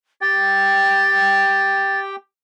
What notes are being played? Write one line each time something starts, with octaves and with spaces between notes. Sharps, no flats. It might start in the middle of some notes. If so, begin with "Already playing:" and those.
G4 G5 A6